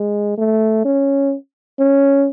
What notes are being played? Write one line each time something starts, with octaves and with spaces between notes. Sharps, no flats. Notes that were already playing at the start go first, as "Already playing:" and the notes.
Already playing: G#3
A3
C#4
C#4